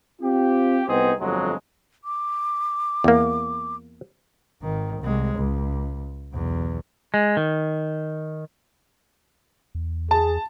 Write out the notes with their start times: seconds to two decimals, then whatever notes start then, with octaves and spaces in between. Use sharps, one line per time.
0.21 C4 F4 G4
0.87 C2 B3 C4 D#4 G#4
1.20 G1 F2 F#3 G#3
2.04 D6
3.04 E2 A#3
4.61 G#1 D#3
5.00 C2 G#3
5.36 C#2
6.33 B1 E2
7.14 G#3
7.37 D#3
9.75 E2
10.11 G#4 A5